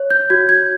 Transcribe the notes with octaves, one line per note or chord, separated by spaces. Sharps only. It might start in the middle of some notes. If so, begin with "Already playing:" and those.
Already playing: C#5
G6
F#4 G#6
G#6